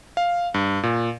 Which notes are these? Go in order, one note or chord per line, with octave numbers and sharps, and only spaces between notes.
F5
G2
A#2